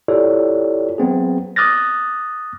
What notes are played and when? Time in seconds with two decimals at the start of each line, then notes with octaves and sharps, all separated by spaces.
0.08 E4 F4 G4 A4 C#5 D5
0.98 F#3 B3 C4 G#4
1.56 D6 D#6 F6 F#6 A6 A#6